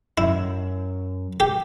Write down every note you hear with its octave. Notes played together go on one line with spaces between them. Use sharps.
F#2 E4
G4